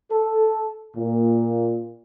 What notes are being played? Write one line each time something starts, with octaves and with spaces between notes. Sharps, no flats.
A4
A#2